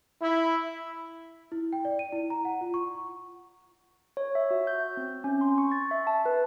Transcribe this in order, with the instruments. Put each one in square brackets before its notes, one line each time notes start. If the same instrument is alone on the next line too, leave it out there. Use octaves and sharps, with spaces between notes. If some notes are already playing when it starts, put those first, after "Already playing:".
[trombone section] E4
[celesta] E4
G5
D5
D#7
E4
A#5
F#5
F4
C#6
[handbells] C#5
E5
F#4
G6
C4
C#4
C6
C#6
A6
E5
A5
B4